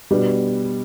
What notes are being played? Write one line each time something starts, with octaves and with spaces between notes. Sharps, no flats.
B2 G3 B3 D4